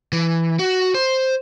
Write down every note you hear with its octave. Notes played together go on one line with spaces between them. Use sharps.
E3
F#4
C5